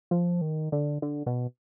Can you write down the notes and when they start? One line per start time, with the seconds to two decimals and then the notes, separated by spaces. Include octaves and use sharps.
0.11 F3
0.41 D#3
0.72 D3
1.02 D3
1.26 B2